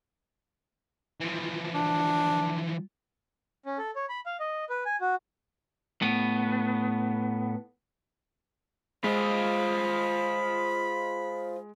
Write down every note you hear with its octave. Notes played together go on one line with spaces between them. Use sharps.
E3 F3
D4
C#4
A4
C#5
B5
F5
D#5
B4
G#5
F#4
A2 B3
G#3 F4 C5 D#5 B5